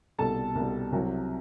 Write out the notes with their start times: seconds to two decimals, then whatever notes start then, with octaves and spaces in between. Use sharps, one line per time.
0.18 C2 B2 G3 A4 A5
0.55 C2 B2 G3
0.92 C2 C3 F#3 C4